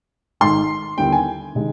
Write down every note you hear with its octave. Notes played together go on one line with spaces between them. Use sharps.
G#1 G#2 D#3 C6
D#2 D3 G3 B3 E4 G5
G#5
C3 D#3 G#3